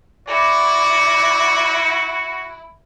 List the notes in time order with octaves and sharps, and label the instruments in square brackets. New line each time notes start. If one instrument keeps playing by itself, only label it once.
[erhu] E4 [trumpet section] F#4 [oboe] D5